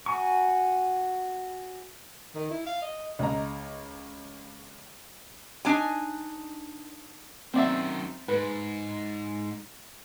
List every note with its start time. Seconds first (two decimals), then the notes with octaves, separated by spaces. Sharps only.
0.06 F#4 G#5 A#5 C#6
2.35 D#3
2.50 E4
2.66 F5
2.82 D#5
3.19 C#2 D#5 A#5
5.65 D4 D#4 C#5 G#5
7.54 F#2 D#3 C4 D5 E5
8.28 G#2 B4